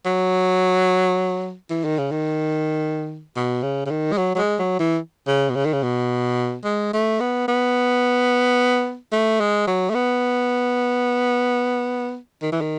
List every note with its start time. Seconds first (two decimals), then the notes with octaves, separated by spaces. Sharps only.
0.05 F#3
1.70 E3
1.84 D#3
1.98 C#3
2.11 D#3
3.36 B2
3.63 C#3
3.86 C#3
3.90 D#3
4.12 G#3
4.18 F#3
4.35 F#3
4.38 G#3
4.59 F#3
4.79 E3
5.27 C#3
5.50 B2
5.55 C#3
5.65 D#3
5.73 C#3
5.83 B2
6.65 G#3
6.93 A3
7.20 B3
7.48 B3
9.12 A3
9.40 G#3
9.67 F#3
9.90 A3
9.95 B3
12.42 D#3
12.52 E3
12.61 D#3